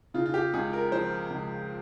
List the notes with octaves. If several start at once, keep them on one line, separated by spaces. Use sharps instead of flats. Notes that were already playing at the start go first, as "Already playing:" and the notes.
C#3 F4
F4
G4
C#2 G#4
A#4
F3 C5
C#2